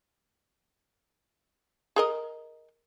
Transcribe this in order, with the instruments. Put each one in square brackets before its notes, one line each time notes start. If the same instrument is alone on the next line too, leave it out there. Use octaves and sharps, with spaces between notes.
[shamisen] G#4 A#4 D#5